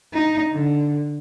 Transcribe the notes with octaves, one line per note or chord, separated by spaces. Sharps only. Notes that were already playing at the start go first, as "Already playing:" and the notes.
D#4
D3